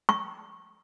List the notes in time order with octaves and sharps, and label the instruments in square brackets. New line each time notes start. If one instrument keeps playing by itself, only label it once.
[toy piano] C#6